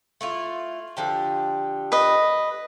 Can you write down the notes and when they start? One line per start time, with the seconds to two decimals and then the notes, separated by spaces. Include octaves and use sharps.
0.21 A3 E4 F4
0.97 D3 F3 G4
1.92 B4 D#5